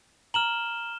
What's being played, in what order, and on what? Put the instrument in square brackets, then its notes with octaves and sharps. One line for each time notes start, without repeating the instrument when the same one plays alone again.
[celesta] A#5 F#7 [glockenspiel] F6 E7 G7